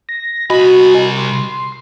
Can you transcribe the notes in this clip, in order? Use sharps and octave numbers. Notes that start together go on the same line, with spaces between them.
A#6
C2 F#4 D#5 G#5 B5
C6